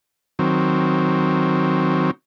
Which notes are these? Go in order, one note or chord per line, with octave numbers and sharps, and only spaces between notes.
D#3 F#3 C4